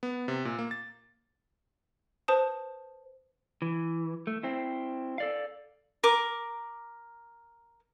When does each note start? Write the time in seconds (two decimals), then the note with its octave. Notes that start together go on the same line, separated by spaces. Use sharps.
0.03 B3
0.28 C3
0.45 A#2
0.59 A#3
0.71 A6
2.28 B4 C5 A5 D#6
3.62 E3
4.27 A3
4.43 C4 E4
5.18 A4 D5 F5
6.03 A#4 D6